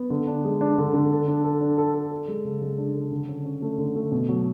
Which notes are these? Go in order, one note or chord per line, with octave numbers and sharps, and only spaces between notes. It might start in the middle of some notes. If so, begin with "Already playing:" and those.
Already playing: B3
D3
D4
G#3
D4
D3
D3
A4
D4
A4
D4
A4
A4
A4
G#3
C#3
G#3
D4
A4
D3
C#4
C#4
A3
D3
A3
B2
F#3